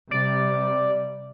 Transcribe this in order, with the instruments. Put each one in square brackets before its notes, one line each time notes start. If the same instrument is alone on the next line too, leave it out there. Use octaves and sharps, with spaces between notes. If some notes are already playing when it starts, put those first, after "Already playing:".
[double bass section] C3 G3 [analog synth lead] D5